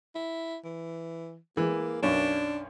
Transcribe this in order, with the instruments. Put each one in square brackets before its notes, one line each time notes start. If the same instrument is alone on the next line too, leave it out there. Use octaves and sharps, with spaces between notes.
[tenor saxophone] E4
E3
[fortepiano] E3 G#3 [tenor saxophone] A#3
[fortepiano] B1 F#2 C#4 [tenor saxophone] D4